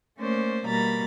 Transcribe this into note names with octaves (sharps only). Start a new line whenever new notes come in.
A3 A#3 C#4 C5 D5
B2 G3 A#3 A#5 B5 A6